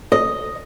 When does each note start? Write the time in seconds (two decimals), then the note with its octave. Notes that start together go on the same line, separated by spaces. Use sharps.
0.12 D#5